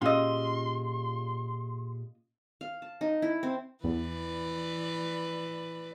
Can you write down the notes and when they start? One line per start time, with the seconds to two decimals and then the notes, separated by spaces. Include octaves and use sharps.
0.02 A#2 C#4 F4 G4 G#4 D#5 C6 E6
2.61 F5
2.82 A5
3.01 D#4
3.22 E4
3.43 C4
3.84 E2 E3 B4 D5